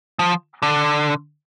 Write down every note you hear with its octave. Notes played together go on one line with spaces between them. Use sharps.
F3
D3